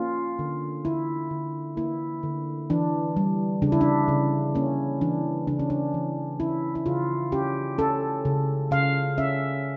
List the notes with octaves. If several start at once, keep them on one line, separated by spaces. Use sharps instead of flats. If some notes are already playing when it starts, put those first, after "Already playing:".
Already playing: A#3 C#4 F4
D3
D3 E4
D3
A#3 E4
D3
E3 D4
G3
C#3 D4
E4
D4
C#3
A#3 C#4
E3 D4
C#3 D4
C#4
D4
E3
C#4 E4
E4
C#3 F4
C#4 G4
C#4 A4
C#3
C#3 F5
C#4 E5